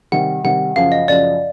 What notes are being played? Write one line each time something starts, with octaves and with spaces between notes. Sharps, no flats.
C3 D#3 G3 F#5
C3 D#3 G3 F#5
F#2 C#3 F3 F5
D#5
F#2 C#3 F3 D5